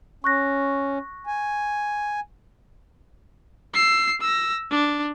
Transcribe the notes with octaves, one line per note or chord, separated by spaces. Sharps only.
C#4 C#6 F#6 A#6
G#5
E6 C7
E6 A#6
D4